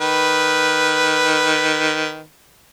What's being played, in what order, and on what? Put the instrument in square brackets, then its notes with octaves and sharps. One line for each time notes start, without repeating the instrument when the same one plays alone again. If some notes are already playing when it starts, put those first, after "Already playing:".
[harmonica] D#3 B4